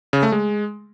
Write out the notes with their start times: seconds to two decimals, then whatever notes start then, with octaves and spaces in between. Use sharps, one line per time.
0.13 C#3
0.23 A3
0.32 G#3